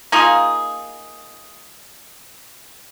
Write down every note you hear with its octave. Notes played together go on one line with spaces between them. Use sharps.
A#3 D#4 F4 G#4